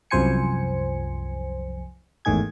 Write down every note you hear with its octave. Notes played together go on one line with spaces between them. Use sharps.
C2 F#2 F3 C5 G#5 C#7
G#1 E2 A2 D#3 G#4 G#6